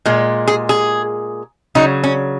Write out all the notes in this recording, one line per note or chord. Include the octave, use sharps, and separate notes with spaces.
A#2 G#3
G#4
G#4
C#3 F#3 D#4
C#4